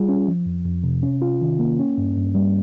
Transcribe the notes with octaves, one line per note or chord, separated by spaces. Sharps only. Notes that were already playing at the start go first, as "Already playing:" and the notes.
Already playing: G3 F4 G#4
C#4
F3
F2
F2
C3
C#4
F4
D#3
A#3
C#4
G2
G2
G3